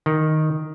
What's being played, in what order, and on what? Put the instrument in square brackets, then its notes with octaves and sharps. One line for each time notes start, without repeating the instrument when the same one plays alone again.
[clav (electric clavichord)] D#3